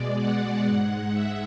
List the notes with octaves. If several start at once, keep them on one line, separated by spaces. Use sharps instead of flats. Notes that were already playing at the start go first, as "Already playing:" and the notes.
Already playing: B2 G#3 D5
F#5
G#2 G#3
E5